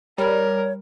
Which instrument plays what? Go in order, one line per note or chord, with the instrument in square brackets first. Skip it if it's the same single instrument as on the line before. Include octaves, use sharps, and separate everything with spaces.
[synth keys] G3 [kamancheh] A#4 [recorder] C#5